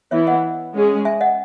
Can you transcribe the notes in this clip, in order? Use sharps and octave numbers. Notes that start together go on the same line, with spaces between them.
E3 B3 E4 C#5 E5
D#5 F#5
G#3 C#4 G#4
E5 G#5
D#5 F#5